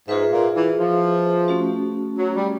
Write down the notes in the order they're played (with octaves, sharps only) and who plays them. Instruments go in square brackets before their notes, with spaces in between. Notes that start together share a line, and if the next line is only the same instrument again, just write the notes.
[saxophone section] G#2 [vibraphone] F4 G#4 B4 E5
[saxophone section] A#2
E3
F3
[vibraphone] A3 C#4 F#4
[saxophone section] F#3
G3